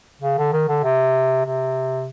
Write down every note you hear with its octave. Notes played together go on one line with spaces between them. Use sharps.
C#3
D3
D#3
D3
C3
C3